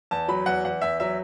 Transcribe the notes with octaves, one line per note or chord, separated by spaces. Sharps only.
E2 A5
F#3 B5
E2 F#5
E2 F#5
E2 E5
F#3 E5